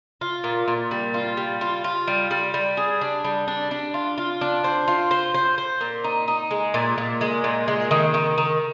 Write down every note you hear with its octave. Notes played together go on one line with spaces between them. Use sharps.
F4
A#2
A#2
G3
F4
G3
F4
F4
G3
G3
G3
G#4
D4
G3
D4
D4
F4
F4
D4
C5
F4
C5
C5
C5
A#2
D#4
D#4
G#3
A#2
A#2
G#3
A#2
G#3
D#3
D#3
D#3